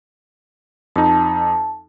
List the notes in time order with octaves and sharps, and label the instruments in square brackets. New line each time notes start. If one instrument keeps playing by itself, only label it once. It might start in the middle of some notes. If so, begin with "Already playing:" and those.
[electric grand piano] F2 D#4 [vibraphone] A5